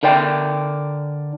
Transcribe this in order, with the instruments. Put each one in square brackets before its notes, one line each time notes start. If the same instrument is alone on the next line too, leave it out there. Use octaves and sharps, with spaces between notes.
[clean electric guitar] D3 A#4 D5 G5